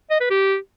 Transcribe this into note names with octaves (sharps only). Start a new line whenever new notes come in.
D#5
B4
G4